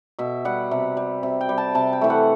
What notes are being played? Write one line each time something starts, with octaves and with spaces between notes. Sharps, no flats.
B2 E5
G3 F#5
C3
G3
C3
G5
G3
A5
C3 A5
G5
E3 A3
F#5